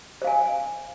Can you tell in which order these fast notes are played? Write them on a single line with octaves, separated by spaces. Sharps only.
C5 F5 G#5